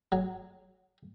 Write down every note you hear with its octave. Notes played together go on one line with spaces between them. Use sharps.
F#3